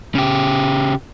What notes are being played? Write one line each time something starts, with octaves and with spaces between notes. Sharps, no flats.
C#3 G4